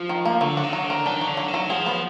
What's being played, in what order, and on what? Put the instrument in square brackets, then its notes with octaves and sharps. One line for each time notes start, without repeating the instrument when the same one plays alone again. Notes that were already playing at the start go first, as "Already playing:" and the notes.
Already playing: [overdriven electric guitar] F3
[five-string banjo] D#3
A#3
[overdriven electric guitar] D3 [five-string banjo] F#3
[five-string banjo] F#4
[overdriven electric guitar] D#3
[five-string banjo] F#3
[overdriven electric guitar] D3
[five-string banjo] A#4
[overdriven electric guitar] D#3 [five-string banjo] D4
[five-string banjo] F#3
[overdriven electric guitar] D3
[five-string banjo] F#3
[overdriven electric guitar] D#3
[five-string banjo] F#3
[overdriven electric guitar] F3 [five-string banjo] G#4
[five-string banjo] B3